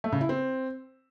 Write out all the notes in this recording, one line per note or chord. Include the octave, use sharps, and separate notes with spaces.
A3
C#3
E4
C4